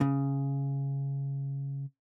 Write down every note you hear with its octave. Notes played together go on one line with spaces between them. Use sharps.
C#3